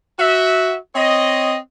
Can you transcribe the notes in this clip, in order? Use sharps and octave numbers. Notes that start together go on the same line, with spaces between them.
F#4 E5
C4 C#5 D#5